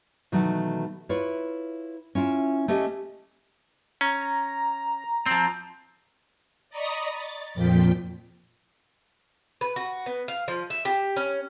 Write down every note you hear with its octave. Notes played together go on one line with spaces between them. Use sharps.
B2 D#3 E3 F#3 A3
E4 F4 B4 C#5
C#4 E4 F4
A3 C#4 G4 D#5
C#4 A#5
F3 C4
D5 D#5 A#5 B5 C#6 D#6
A6
F2 A#2 F3 G5 B6
B4
F#4
B3
F5
F3
E5
G4
C#4